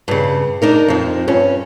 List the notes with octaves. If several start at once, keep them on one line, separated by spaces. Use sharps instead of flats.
G2 C#3
D4 D#4 A#4
F2 F3
G2 C#4